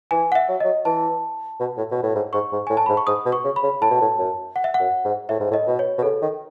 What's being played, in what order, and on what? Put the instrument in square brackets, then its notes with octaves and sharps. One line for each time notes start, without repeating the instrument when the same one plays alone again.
[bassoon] E3 [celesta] G#5
[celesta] F#5
E5
[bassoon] F#3
[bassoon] F#3 [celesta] D#5
[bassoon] E3 [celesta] A5
[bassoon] B2
A2
B2
A2
G#2
[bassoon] G#2 [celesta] C#6
[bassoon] G#2
[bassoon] A2 [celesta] G#5
[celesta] A5
[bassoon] G#2 [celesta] B5
[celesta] C#6
[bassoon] G#2 [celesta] D#6
[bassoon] B2
[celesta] C#6
[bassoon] C#3
[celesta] B5
[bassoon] C#3
[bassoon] A2 [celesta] A5
[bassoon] B2
A2
F#2
[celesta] F#5
E5
F#5
[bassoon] F#2
G#2
[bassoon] A2 [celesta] E5
[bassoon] G#2
A2
[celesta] D#5
[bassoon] B2
[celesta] C#5
[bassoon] B2
[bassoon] C#3 [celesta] A4
[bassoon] D#3